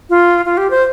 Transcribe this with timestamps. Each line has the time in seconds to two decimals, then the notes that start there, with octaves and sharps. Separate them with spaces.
0.10 F4
0.46 F4
0.57 G4
0.70 C5